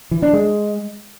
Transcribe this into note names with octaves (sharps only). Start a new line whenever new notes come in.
E3
D4
G#3